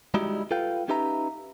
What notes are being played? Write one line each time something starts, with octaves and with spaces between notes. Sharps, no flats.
G3 G#3 D#4 E4 F#4 G4
F4 A4 B4 F5 G5
C#4 D#4 G4 B4 E5 A#5